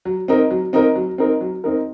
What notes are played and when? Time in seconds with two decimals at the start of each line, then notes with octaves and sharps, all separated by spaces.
0.05 F#3
0.28 C4 D#4 A#4
0.50 F#3
0.73 C4 D#4 A#4
0.95 F#3
1.18 C4 D#4 A#4
1.41 F#3
1.64 C4 D#4 A#4